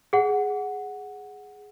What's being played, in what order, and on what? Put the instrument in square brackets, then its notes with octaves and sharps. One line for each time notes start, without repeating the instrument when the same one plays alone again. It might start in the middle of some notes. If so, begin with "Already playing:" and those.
[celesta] G#4 F#5